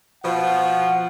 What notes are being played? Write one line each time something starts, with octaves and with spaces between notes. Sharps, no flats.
B2 F3 F#5